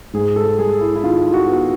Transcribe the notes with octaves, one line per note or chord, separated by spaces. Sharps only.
G#2 G#4
A4
G3 G#4
E4
E4
D#3 F4
F#4
B3